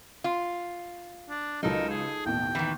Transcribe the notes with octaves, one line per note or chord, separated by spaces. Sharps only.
F4
D4
C#2 F#3 D#4 A4 A#4
G#4
A1 D#2 B2 G5
D#3 E3